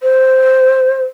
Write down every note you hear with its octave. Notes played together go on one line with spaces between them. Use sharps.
C5